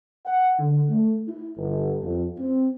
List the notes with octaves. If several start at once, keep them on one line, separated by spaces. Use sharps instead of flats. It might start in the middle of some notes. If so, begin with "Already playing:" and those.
F#5
D3
A3
E4
G1
F2
C4